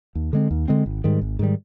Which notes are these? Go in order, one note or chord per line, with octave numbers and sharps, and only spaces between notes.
D#2
D3 G#3 C4
D#2
D3 G#3 C4
G#1
G#2 D#3 G3
G#1
G#2 D#3 G3